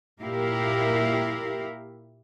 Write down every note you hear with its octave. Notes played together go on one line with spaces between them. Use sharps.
A#2 E4 G4 A#4 F5